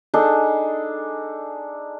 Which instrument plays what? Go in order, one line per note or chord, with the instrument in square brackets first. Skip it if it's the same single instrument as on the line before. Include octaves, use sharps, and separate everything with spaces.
[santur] D4 D#4 G#4 A4